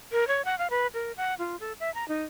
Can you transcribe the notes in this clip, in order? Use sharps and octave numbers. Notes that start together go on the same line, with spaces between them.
A#4
C#5
F#5
F5
B4
A#4
F#5
F4
A4
E5
A#5
D#4